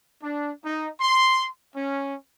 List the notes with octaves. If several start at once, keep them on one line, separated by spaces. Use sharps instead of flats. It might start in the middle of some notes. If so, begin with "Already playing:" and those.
D4
D#4
C6
C#4